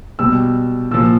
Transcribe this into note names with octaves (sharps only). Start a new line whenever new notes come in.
B2 G3 E6
A#2 F3 E6